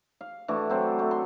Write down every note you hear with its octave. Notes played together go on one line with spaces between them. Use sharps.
F5
E3 A3 D4 F#4
F#3 C4
A3
C6